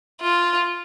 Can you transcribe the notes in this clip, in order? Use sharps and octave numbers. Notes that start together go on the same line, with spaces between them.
F4